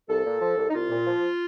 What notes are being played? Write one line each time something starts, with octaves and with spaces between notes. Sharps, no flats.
C2 A4
A#2
F3
C2
D#4
C2 F4
A#2
F3